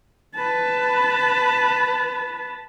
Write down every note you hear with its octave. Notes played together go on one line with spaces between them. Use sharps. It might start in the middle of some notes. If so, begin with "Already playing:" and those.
B4 A5